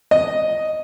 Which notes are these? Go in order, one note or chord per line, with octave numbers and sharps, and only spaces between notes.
D#5